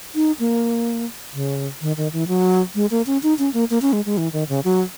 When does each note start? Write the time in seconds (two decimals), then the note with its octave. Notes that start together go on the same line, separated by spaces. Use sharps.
0.15 D#4
0.39 A#3
1.33 C#3
1.81 D#3
1.97 D#3
2.13 E3
2.28 F#3
2.75 G#3
2.91 A#3
3.06 C#4
3.23 D#4
3.39 C#4
3.53 A#3
3.70 A#3
3.82 C#4
3.93 G#3
4.06 G#3
4.17 E3
4.33 D#3
4.49 C#3
4.64 F#3